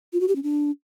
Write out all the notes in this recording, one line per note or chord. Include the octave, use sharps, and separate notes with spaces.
F4
F#4
G4
C#4
D4